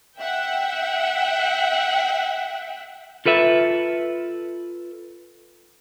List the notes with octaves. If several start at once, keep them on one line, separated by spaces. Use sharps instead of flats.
E5 F#5 G5
F4 A4 B4 E5